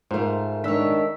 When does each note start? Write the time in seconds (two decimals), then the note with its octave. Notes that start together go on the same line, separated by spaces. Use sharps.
0.11 G#2 A3 F4 A#4 C5
0.64 D#3 G#3 D4 C#5 E6 B6